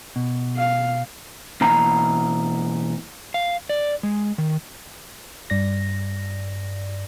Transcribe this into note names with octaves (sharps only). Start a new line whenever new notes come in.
B2
F5
B2 E3 A#3 A#5 B5
F5
D5
G#3
D#3
G2 D5 A#6